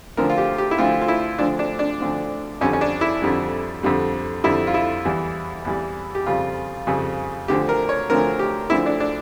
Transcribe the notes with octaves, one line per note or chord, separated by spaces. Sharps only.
D2 D3 F3 A#4
F4
G4
G4
E4
D2 D3 F3 F4
F4
E4
D2 D3 F3 D4
D4
D4
D2 D3 F3
F2 D3 G3 C#4
C#4
D4
E4
F2 D3 G3
F2 D3 G3
F2 D3 G3 E4
F4
E4
E2 E3 G3
E2 E3 G3
G4
F2 C#3 G3 F4
F2 C#3 G3
D2 D3 F3 G4
A#4
C#5
D2 D3 F3 A#4
G4
D2 D3 F3 E4
D4
D4